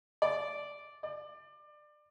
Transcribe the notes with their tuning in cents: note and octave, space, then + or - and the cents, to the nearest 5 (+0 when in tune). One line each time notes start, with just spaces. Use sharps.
D5 -5
D5 +25